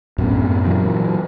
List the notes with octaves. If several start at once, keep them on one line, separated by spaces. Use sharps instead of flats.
F#2 A2 B3
A#2 E3 F#3